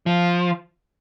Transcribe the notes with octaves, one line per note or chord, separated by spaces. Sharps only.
F3